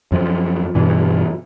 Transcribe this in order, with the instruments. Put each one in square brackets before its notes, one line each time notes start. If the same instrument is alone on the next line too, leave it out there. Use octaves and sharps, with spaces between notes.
[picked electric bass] F#2 F3
G2 B2 E3